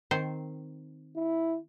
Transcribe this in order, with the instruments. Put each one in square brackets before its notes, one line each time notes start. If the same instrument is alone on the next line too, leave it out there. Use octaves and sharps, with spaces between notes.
[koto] D#3 C4 C5
[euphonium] E4